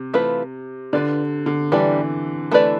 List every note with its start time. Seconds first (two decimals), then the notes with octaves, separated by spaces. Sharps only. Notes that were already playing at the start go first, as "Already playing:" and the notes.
Already playing: C3
0.14 E3 A3 C4 F4 B4
0.93 D3 D4 F4 B4 D5
1.46 D3
1.72 E3 G3 D4 G4 B4 D5
2.52 A3 E4 B4 D5